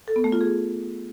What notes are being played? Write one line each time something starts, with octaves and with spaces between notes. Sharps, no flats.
A4
B3
A3
F4
G#4